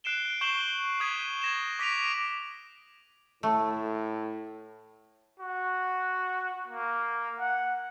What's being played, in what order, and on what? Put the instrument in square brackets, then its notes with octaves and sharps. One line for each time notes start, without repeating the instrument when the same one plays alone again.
[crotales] F#6 C7 D7 E7 G7
C#6 G6 C7 E7 F#7 G7
D#6 F#6 G#6 B6 D#7
G#6 A#6 E7
D6 A#6 B6 D7 D#7 F7
[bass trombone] A2 [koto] A3
[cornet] F#4
A#3
F#5